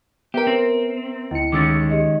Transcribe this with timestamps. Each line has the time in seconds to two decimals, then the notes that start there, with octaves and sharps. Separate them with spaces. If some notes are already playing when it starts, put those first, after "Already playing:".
0.34 B3 G4 A#4 E5 D7
0.47 C4
1.31 D2 E4 C#7
1.52 D#3 G#3 C#4 D6 E6 A6
1.90 G4 G#4 D#5